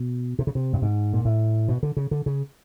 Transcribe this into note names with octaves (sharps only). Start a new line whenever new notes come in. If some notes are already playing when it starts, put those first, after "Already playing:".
Already playing: B2
C3
C#3
C3
G2
G#2
A#2
A2
B2
D3
C#3
D3
C#3